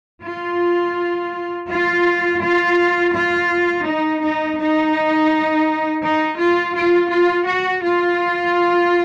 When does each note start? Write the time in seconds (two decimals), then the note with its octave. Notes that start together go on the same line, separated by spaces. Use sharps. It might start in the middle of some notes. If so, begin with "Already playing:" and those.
0.23 F4
1.68 F4
2.40 F4
3.13 F4
3.85 D#4
4.21 D#4
4.57 D#4
6.03 D#4
6.38 F4
6.75 F4
7.11 F4
7.47 F#4
7.83 F4